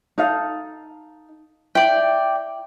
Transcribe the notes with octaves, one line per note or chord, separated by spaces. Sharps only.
D#4 A4 F5
E4 D5 G5